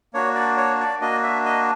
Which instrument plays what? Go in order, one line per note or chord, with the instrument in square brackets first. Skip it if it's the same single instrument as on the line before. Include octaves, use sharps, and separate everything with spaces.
[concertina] A#3 D4 F#4 C#5
D5
C#5
D5
A#3 D4 F#4 D#5
E5
D#5